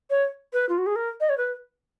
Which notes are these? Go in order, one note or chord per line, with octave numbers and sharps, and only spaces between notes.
C#5
B4
F4
F#4
G#4
A#4
D#5
C#5
B4